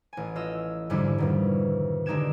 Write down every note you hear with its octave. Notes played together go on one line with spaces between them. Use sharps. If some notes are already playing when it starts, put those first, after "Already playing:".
A1 G#5
F4 D#5 E6
F2 G#2 D3 G3 C#4 E4
F2 B2 D#3
D3 G#3 D#4 G4 G#6 E7